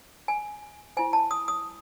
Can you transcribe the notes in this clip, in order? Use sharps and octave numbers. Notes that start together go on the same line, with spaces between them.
G#5
E4 C5 G#5
A5
D#6
D#6